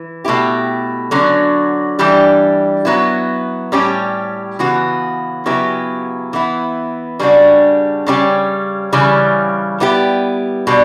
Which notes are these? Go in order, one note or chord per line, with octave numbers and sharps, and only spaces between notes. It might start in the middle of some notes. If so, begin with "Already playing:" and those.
Already playing: E3
B2 A3 E4 G4
D3 F#3 C#4 F#4
E3 G3 D4 G4
F#3 B3 E4
A2 G3 C#4 G4
C#3 E3 B3 F#4
C#3 F#3 B3 E4 G4
E3 B3 E4
C#3 G3 D4 F#4
C#3 G3 C#4 G4
C#3 E3 G3 C#4
G3 B3 E4 G4
B2 G3 D4